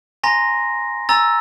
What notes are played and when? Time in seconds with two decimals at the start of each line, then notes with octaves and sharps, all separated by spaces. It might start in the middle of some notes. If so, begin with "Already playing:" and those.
0.24 G#5 A#5 C6 A#6
1.09 G#5 A#5 E6 A6